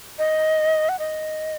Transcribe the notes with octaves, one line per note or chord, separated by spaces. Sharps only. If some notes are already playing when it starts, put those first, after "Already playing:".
D#5
F#5
D#5